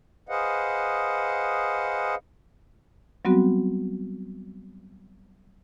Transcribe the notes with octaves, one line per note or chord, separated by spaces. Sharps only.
G#4 B4 C5 D#5 F5 F#5
F#3 G3 B3 C4 F#4